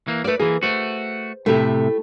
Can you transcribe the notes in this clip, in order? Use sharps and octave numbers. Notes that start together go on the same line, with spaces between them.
E3 A#3
A3 A#3 B4 D5
E3 A#3 G#4
A3 F#4 C5
A2 C3 A3 E4 G4